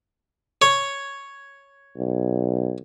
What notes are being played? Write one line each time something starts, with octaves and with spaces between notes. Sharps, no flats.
C#5
B1